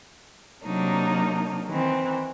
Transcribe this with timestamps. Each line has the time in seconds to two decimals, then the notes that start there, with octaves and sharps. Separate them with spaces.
0.65 C3 F#3 A#3 D4 D#4
1.67 D#3 E3 C4